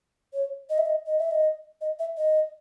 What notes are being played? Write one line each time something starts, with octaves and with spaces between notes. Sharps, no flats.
C#5
D#5
E5
D#5
D#5
E5
D#5
D#5
E5
D#5